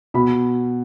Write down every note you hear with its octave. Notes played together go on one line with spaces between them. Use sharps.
B2 B5